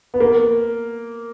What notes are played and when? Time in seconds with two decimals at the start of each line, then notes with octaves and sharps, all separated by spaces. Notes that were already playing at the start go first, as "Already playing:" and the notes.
0.14 B3
0.20 A#3